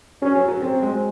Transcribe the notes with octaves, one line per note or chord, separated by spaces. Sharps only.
F#3 C#4
F#3
F#3
F#3 C4
G#3